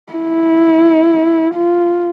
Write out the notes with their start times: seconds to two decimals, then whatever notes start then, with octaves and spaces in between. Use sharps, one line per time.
0.13 E4
1.54 F4